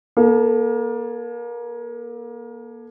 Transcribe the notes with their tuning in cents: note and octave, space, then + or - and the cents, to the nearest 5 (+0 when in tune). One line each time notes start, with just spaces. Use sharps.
A#3 +30 A4 +0